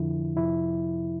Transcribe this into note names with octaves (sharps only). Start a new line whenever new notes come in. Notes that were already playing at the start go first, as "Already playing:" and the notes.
Already playing: F2 D3 F3 E4
F2 C3 F3 E4